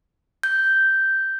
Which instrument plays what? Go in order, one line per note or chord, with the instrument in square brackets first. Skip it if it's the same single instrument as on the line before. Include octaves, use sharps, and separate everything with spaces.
[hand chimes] G6